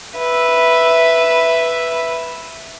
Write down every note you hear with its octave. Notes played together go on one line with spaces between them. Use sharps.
B4 E5